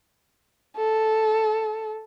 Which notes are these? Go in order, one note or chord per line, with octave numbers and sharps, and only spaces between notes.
A4